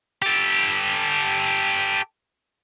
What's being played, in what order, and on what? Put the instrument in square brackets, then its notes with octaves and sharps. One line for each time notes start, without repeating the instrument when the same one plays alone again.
[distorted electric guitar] G4 A4